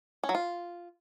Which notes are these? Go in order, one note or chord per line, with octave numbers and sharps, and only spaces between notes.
C#4
F#3
F4